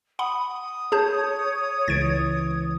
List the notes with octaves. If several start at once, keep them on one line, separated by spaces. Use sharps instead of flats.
F#5 B5 D#6
G#4 C#5 A5 G6
C#2 E3 G#6 A6 D7